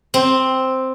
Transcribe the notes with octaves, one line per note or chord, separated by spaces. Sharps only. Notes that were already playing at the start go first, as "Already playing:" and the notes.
C4